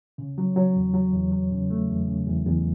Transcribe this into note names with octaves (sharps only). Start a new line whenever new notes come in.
C#3
F#3
F#3
E2
F#3
E2
F#3
C#3
A3
E2
C#3
E2
E2